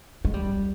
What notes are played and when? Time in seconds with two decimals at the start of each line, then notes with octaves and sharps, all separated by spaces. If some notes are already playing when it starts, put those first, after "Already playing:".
0.25 G#3
0.34 G3